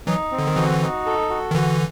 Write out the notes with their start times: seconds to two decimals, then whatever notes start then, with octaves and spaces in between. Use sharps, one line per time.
0.07 E3 F#3 D#4
0.32 C4
0.39 D3
0.47 D#3
0.56 D3 E3 F#4
0.82 D#4
1.06 A4
1.30 F#4
1.51 D#3
1.55 D3 E3 F#4